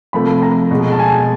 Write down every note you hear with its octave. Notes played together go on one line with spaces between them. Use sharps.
C3 F3 A3 B5
A#5
B2 G#3
A5
G#5